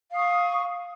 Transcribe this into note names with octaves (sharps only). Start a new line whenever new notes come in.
F5 C#6 D#6